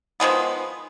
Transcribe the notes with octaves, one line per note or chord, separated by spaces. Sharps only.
D#3 F3 G#3 B3